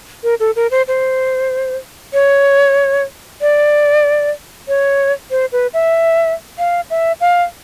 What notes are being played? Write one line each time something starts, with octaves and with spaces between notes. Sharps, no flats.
A#4
A4
A#4
C5
C5
C#5
D5
C#5
C5
B4
E5
F5
E5
F5